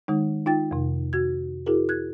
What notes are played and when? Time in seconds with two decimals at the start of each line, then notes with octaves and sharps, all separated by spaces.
0.08 D#3 G#3 D#4
0.46 D#4 F4 G5 A6
0.71 F2 C3
1.13 F#4 G#6
1.66 E4 F#4 G#4 A#4
1.89 F#6 G#6